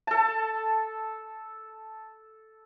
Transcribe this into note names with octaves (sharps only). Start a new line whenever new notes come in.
A4 A5